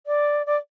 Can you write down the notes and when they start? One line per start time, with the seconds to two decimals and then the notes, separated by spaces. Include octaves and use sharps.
0.06 D5
0.46 D5